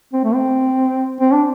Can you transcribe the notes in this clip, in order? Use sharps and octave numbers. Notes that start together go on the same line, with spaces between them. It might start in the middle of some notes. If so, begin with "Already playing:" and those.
C4
A3
C4
C4
D4